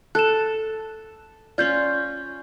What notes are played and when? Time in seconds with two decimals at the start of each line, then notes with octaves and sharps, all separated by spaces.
0.15 A4 F#6 E7
1.58 C#4 F4 D5 G6